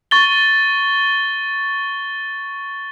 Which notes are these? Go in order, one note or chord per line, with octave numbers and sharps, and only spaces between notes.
C#6 A6 G7